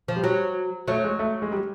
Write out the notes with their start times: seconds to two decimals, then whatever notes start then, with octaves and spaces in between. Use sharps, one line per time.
0.08 F3
0.16 G3
0.24 F#3
0.88 F#3 A3
1.04 G#3
1.19 A3
1.42 G#3
1.52 G3